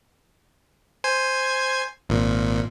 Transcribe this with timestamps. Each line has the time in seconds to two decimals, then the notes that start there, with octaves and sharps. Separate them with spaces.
1.04 C5 G#5 G#6
2.09 G#1 A#2